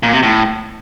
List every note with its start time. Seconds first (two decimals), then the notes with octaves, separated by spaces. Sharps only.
0.03 A#2
0.13 C3
0.23 A2